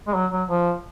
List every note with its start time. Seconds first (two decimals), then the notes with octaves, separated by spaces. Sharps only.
0.08 G#3
0.15 F#3
0.32 F#3
0.49 F3